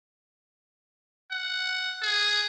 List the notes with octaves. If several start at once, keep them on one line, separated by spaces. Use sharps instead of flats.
F#5
G#4